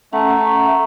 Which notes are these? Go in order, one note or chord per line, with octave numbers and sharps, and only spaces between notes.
A3 C#4 F#5 A#5